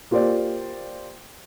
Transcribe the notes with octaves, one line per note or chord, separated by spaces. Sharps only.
A#3 F4 G4 C5 D5